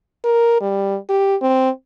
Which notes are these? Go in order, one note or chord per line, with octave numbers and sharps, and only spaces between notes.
A#4
G3
G4
C4